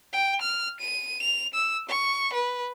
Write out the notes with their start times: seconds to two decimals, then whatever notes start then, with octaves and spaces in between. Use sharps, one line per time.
0.13 G5
0.41 F6
0.80 D#7
1.22 F7
1.54 E6
1.89 C#6
2.33 B4